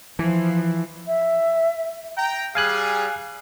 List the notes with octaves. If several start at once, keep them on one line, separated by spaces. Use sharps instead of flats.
E3 F3
E5
G5 A#5
G3 G#4 F5 G#5 F#6